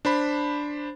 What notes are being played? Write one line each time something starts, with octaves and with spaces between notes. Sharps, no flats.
D4 C5 B5